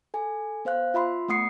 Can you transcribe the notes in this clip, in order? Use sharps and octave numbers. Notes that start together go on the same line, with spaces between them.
A4 G#5
B3 C5 F5 F#6
F4 E5 B5 C6
A3 B3 F#5 D#6 C7 C#7